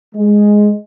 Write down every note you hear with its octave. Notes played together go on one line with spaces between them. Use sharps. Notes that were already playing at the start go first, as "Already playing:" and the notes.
G#3